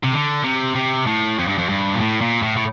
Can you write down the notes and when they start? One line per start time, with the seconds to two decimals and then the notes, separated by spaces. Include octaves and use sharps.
0.03 C3
0.12 D3
0.44 C3
0.75 C3
1.06 A2
1.38 F2
1.48 G2
1.58 F2
1.69 G2
1.94 A#2
2.01 A2
2.21 A#2
2.43 A2
2.57 A2